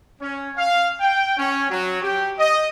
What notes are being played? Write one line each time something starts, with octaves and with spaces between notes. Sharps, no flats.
C#4
F5
G5
C#4
F#3
G4
D#5